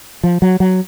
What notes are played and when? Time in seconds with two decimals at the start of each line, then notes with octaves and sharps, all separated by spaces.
0.23 F3
0.42 F#3
0.60 F#3